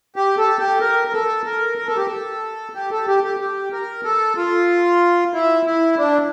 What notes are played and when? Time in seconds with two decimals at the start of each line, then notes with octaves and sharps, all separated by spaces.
0.16 G4
0.38 A4
0.59 G4
0.80 A#4
1.08 A#4
1.13 A4
1.46 A#4
1.78 A#4
1.87 A4
1.97 G4
2.07 A4
2.75 G4
2.91 A4
3.07 G4
3.23 G4
3.40 G4
3.72 A#4
4.04 A4
4.37 F4
5.34 E4
5.66 E4
5.98 D4